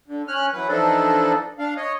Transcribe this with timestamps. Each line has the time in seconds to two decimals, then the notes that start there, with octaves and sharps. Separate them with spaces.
0.08 D3
0.28 C#4 F6 F#6
0.53 E3 F#3 B4
0.69 E3 F3 D4 D#4 A4
1.59 D4 F5
1.77 C#5 D#5